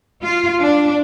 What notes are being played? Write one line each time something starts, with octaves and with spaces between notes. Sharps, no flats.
F4
D4